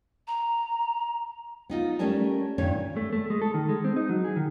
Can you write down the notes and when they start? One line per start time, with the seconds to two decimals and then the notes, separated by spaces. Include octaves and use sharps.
0.27 A#5
1.70 B3 D#4 F4
1.99 G3 A3 C#4 A#4 A5
2.58 G2 A#2 D#3 C#4 C#5
2.97 A3
3.12 A3
3.30 G#3
3.42 A4
3.54 D#3
3.69 G#3
3.84 C4
3.96 D#4
4.10 F#3
4.25 G#4
4.36 D#3